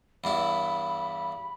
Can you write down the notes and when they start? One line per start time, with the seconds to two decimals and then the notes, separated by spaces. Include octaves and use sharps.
0.24 E2 G2 E4 B5